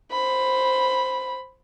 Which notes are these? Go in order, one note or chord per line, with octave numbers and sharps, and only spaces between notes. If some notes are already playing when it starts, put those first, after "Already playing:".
C5 B5